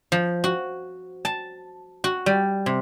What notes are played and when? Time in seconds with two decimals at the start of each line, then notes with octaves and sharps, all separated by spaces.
0.12 F3
0.44 F#4
1.25 A5
2.04 F#4
2.26 G3
2.66 C3